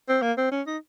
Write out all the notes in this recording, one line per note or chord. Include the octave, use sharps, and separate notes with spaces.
C4
A#3
C4
C#4
D#4